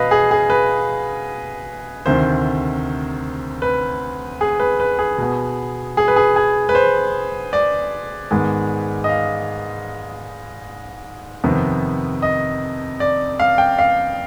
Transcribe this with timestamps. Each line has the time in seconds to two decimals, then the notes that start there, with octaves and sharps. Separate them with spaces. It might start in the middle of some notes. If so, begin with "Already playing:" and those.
Already playing: B2 B4 D#5 F5
0.11 G#4
0.31 G#4
0.50 B4
2.06 D2 C3 D#3 C5
3.62 B4
4.41 G#4
4.60 B4
4.80 B4
4.99 G#4
5.18 B2 B3
5.97 G#4
6.08 B4
6.16 G#4
6.36 G#4
6.69 B4
6.75 C5
7.53 D5
8.31 G#2 D#3 G#3 B3
9.04 D#5
9.09 F5
11.44 F2 C3 D#3 B3
12.22 D#5
13.00 D5
13.40 F5
13.58 G5
13.79 F5